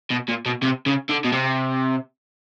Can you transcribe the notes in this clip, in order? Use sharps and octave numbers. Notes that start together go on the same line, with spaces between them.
B2
A#2
B2
C3
C#3
D3
B2
C3